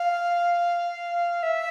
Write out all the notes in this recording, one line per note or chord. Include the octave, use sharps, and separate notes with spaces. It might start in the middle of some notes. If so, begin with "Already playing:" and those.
Already playing: F5
E5